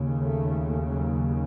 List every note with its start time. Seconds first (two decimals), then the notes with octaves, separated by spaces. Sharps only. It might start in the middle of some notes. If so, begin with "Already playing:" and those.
Already playing: D#2 C#3
0.20 A3
0.91 F#3